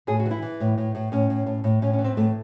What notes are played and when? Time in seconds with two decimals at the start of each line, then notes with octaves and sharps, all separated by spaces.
0.07 A2 G#4
0.20 F#4
0.26 E3
0.31 E4
0.42 E3
0.60 A2
0.78 A2
0.95 A2
1.12 A2 C#4
1.30 A2
1.46 A2
1.64 A2
1.82 A2 C#4
1.93 C#4
1.99 E3
2.04 C4
2.17 A2 A3